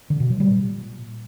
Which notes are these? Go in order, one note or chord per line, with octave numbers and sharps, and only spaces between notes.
D3
B2
F#3
G3
A#2